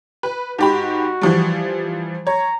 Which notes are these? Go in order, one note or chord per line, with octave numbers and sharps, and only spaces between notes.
B4
G#2 F#4 G4 B5
E3 F3 G3
C#5 A#5